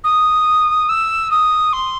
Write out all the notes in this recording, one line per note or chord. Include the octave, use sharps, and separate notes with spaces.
D#6
E6
D#6
C6